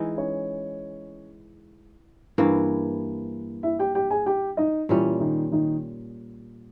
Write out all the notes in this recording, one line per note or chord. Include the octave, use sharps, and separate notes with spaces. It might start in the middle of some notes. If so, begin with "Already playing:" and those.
Already playing: E3 G#3 D#4
C#4 C#5
G2 E3 A#3
E4 E5
G4 G5
G4 G5
G#4 G#5
G4 G5
D#4 D#5
A#2 E3 G3 C#4 E4
D#3 D#4
D#3 D#4